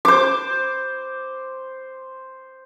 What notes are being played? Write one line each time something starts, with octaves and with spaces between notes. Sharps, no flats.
C5 D6